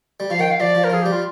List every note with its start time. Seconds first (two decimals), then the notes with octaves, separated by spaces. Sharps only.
0.20 G3
0.30 F3 F5
0.39 D#3 G5
0.50 F5
0.60 F3 D5
0.75 F3
0.84 A#4
0.90 F3 G#4
1.02 G3 G4
1.12 F4